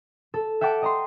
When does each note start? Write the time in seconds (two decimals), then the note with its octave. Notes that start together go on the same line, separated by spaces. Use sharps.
0.34 A4
0.61 E5 F#5 G5 A5 D6
0.82 D#5 A#5 C6